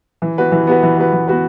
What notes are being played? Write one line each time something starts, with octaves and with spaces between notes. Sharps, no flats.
E3
B3 F#4 B4
E3
B3 F#4 B4
E3
B3 F#4 B4
E3
B3 F#4 B4